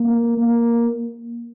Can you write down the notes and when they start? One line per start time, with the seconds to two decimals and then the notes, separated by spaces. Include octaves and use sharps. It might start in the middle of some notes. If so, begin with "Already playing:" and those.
Already playing: A#3
0.38 A#3